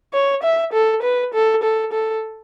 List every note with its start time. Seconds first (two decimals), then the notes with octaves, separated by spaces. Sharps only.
0.13 C#5
0.43 E5
0.73 A4
1.02 B4
1.34 A4
1.63 A4
1.92 A4